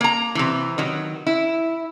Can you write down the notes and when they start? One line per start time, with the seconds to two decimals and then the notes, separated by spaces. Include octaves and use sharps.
0.01 A#3 A#5
0.35 C3 E3
0.78 D#3 F#3
1.26 E4